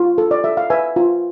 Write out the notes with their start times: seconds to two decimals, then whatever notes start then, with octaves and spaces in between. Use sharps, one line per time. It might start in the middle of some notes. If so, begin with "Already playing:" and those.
Already playing: F4
0.18 A4
0.31 D5
0.44 A4 E5
0.57 F5
0.70 B4 E5 G#5
0.96 F4